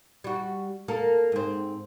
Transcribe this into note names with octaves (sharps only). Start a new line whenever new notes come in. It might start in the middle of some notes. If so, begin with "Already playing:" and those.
G3 F#4
A#3 A4 A#4
G#2 C4